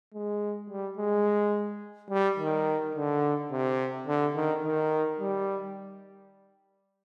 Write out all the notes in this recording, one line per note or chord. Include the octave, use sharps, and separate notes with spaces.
G#3
G3
G#3
G3
D#3
D3
C3
D3
D#3
D#3
G3